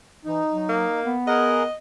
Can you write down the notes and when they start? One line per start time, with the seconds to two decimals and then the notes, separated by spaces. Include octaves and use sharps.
0.25 E3 D#4
0.50 F#3
0.69 A#3
1.03 B3
1.28 G#4 A#4 D#5 F#5